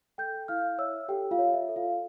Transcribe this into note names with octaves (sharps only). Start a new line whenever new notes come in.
A4 G5 G6
E4 F5 F6
C#5 E5 E6
G4 A4 G5
F4 F5
C#5
E5
A4
F4 F5